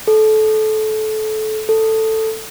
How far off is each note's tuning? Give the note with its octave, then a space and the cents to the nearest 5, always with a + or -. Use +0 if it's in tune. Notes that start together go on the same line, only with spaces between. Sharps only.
A4 -25
A4 +10